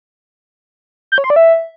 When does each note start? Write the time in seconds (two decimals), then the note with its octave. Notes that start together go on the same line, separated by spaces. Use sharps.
1.12 G6
1.18 C#5
1.24 C6
1.30 D5
1.36 E5